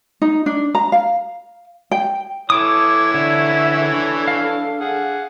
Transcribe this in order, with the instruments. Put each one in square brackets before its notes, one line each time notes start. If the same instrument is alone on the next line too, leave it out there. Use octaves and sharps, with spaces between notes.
[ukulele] D#4
D4
A#5
F5
G5
[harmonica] E3 E4 C#5 [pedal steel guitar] A4 D6 D#6
[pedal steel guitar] D3 [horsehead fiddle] E5
[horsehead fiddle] D4 A4
[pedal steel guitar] F5
[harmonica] G#4 F#5